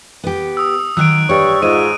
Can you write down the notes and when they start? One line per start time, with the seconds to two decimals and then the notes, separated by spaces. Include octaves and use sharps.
0.24 B3 G4
0.57 D#6 E6
0.97 D#3 F#3 E6 F#6 D7
1.29 G2 G3 C#5 C#6
1.62 G#2 F4 D#7